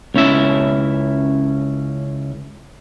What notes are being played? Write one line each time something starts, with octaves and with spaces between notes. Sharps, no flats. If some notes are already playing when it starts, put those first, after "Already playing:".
C#2 C#4 E4 E5